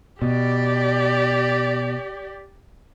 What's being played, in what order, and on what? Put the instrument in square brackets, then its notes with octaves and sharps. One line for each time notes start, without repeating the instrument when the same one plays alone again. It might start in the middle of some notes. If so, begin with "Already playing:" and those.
[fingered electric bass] B2 [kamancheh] G4 D5